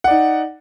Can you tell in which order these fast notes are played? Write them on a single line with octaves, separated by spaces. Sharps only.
F#5 D5 D#4